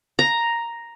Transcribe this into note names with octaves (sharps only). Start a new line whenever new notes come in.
A#5